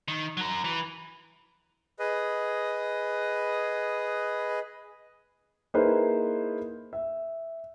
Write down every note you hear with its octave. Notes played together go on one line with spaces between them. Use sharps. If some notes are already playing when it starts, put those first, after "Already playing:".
D#3
F#3 A#4
E3
G#4 B4 D#5
A#3 D#4 E4 G#4 B4 C5
E5